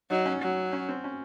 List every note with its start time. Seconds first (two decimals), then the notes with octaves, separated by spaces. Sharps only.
0.10 F#3 D#4
0.26 C#4
0.42 F#3
0.73 C#4
0.89 C4
1.04 C#4